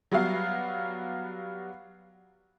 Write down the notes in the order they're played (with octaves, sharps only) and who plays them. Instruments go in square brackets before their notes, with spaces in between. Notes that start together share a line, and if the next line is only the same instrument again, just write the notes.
[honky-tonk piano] F#3 G3 B3 F#4 F5